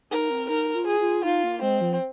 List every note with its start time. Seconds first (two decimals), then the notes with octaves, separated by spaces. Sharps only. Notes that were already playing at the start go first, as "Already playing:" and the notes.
0.11 D#4 A#4
0.30 C4
0.49 D#4 A#4
0.75 F4
0.87 G#4
1.00 F4
1.24 D#4 F4
1.44 A#3
1.62 G#3 C4
1.81 F3